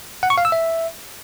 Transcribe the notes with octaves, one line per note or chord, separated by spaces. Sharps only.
F#5
C#6
F5
E6
E5